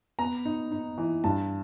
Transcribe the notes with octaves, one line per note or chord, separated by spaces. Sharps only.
B3 A#5
D#4
D#4
E3
G2 A5